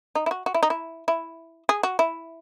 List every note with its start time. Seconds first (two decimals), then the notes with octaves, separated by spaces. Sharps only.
0.15 D#4
0.26 E4
0.31 F#4
0.46 F#4
0.54 E4
0.63 D#4
0.70 E4
1.08 E4
1.69 G#4
1.83 F#4
1.99 E4